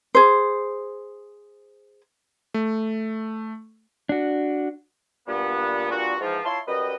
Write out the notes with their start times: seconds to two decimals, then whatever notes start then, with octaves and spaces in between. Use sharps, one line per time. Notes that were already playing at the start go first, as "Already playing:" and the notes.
0.15 G#4 C5
2.54 A3
4.09 D4 F#4
5.28 G2 A#2 B3
5.90 G2 A#2 F#4
6.20 G#2 E3 F3 F4
6.45 E4 F4 C#5 A5 C6
6.67 F#2 G3 G4 B4 D#5